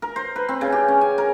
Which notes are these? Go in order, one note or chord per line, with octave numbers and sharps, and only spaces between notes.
A#4
C5
B4
C4
C#3
G4
C#4
G#5
A#4